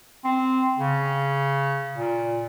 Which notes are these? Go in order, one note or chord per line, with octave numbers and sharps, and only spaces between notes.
C4
C#3
A#2